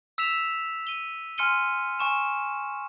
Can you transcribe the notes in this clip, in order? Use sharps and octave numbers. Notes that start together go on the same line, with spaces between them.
E6 B6 E7 F7
D#7 G7
G#5 C6 F6 C#7 D#7 G7
G#5 C#6 E7